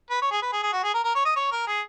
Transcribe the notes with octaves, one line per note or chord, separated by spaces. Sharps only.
B4
C#5
G#4
B4
G#4
G#4
F#4
G#4
A#4
A#4
C#5
D#5
C#5
A#4
G#4